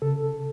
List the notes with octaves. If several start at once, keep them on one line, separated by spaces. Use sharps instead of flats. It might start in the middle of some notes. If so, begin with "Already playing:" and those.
C#3 A4